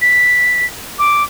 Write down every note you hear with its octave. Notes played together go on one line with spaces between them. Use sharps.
B6
D6